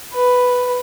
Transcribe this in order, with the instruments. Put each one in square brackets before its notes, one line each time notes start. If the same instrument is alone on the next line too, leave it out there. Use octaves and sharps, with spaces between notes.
[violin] B4